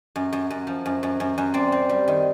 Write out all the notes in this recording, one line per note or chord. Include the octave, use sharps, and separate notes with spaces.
F#2
F#2
F#2
F3
F#2
F#2
F#2
F#2
C4 D5
C4
G3
D#3